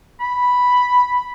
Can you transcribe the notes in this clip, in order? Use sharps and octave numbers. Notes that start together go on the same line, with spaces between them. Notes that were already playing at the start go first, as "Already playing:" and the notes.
B5